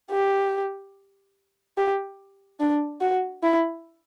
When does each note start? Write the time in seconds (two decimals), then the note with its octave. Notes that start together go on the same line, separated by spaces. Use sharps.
0.11 G4
1.78 G4
2.60 D4
3.01 F#4
3.43 E4